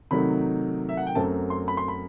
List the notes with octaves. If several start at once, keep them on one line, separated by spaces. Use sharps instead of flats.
C3 D#3 F#3 A3 D#4 B5
E5
F#5
G5
F#2 F#3 A3 C4 A5
C6
B5
C6
B5